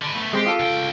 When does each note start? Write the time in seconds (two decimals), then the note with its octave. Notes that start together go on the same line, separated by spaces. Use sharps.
0.02 D3 B4
0.15 A3 B3
0.33 G#3 C4 G4 C5
0.46 F4 A4
0.60 C#2 G5